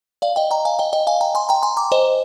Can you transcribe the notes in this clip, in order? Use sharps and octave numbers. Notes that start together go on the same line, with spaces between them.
D5 F5
D#5 G5
G5 A#5
F5 G#5
D#5 G5
D#5 G5
F5 G#5
G5 A#5
G#5 C6
G5 A#5
G#5 C6
A#5 D6
C5 D#5